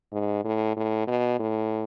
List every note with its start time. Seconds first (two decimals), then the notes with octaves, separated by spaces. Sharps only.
0.12 G#2
0.44 A2
0.76 A2
1.07 B2
1.39 A2